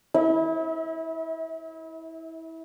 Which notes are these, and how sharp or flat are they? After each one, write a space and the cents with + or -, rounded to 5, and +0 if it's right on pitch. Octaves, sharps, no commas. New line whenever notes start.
E4 -20 E5 -45